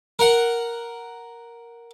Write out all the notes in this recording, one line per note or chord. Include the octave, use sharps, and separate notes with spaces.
A#4 F#5